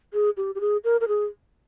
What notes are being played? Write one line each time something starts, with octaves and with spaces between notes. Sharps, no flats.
G#4
G4
G4
G#4
A#4
A#4
G#4